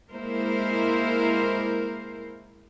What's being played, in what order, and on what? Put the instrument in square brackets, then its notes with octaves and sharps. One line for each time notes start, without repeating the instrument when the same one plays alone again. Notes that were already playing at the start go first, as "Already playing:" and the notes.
[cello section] G#3 A#3 E4 A#4 C5